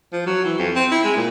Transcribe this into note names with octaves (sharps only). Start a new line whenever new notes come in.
F3
F#3
E3
F2
C4
E4
G#3
A#2